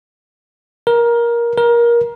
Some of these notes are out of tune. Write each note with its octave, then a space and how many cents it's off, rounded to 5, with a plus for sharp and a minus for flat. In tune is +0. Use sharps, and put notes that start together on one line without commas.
A#4 +15
A#4 +20